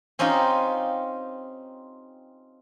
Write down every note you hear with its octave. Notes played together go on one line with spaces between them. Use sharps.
C4 C#4 D#4 F4 G4